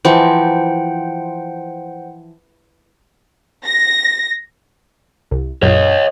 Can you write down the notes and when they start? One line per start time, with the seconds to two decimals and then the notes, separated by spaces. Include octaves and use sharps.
0.05 E3 F3 C5 F#5 G5
3.65 A#6
5.31 C2
5.63 A#1 F#2 C#5 D#5